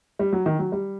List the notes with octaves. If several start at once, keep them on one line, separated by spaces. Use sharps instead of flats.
G3
F#3
D#3
F#3
G3